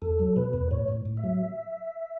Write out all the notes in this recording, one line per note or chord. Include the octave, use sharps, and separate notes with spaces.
E2 A4
F#3
B2 B4
E2
A2 C#5
A2
A2
E5
F#3